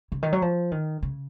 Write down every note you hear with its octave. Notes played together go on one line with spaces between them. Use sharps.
C#3
D#3
F#3
F3
D#3
C#3